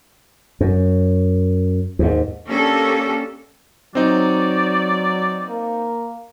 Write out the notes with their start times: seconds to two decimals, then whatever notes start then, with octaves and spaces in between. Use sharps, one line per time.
0.61 F#2
1.99 D#2 G#2
2.46 A#3 C#4 D4 G4 A4
3.95 F#3 C4 D#4 D5
5.48 A#3